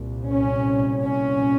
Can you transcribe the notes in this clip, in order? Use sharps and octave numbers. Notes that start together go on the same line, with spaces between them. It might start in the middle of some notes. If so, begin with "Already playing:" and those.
Already playing: C2 A#2
C#4
C#4